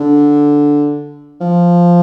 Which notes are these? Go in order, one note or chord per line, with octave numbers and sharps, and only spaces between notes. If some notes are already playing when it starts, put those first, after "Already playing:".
Already playing: D3
F3